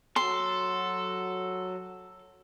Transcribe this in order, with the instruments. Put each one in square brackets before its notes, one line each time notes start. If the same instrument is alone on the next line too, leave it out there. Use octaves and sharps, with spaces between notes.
[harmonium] F#3 [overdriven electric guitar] A4 [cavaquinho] C6